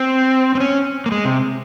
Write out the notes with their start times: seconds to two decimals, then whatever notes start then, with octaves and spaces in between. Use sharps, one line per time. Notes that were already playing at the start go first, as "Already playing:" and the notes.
Already playing: C4
0.55 C4
0.60 C#4
1.06 A#3
1.12 G#3
1.25 C3